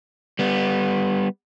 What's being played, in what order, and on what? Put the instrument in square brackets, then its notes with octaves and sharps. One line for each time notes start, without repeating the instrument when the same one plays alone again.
[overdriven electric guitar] G3 B3